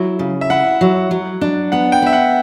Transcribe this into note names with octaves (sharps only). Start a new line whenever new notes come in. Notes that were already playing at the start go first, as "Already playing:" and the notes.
Already playing: F#3 E4
C#3
E5
E4 F#5
F#3
F#3
D4
B3 F#5
G5
B3 E5
F#5